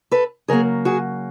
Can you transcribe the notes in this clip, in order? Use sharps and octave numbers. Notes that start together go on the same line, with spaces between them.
A4 B4
C#3 F#3 A#3 G#4 A#4
F#4 G#4